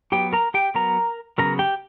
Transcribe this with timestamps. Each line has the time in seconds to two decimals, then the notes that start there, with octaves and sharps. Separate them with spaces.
0.12 F#3 B3 G4 G5
0.33 A#4 A#5
0.54 G4 G5
0.75 F#3 B3 A#4 A#5
1.38 C#3 F#3 B3 A#4 A#5
1.59 G4 G5